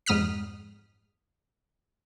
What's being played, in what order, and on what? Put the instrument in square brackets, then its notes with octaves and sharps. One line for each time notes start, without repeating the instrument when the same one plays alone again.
[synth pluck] F2 G#2 D#6 F6 B6